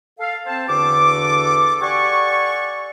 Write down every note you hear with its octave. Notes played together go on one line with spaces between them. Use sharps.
A4 F5
C4 C5 A5
E2 D3 D4 F#4 A4 D6
G4 A4 D5 F#5 G#5 C#6